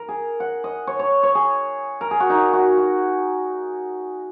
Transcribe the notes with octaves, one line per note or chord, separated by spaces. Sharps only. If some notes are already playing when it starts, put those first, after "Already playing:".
Already playing: A#4
G#4
F#5
D#5
C#5
C#5
C#5
G#4
A#4
G#4
F#4
D#4
F#4
F#4